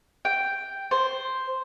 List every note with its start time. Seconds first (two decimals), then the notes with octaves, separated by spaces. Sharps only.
0.25 G5
0.91 C5